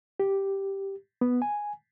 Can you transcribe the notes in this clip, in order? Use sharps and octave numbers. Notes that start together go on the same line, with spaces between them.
G4
B3
G#5